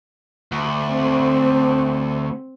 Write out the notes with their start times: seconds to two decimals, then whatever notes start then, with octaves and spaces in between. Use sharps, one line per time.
0.52 D2
0.88 C4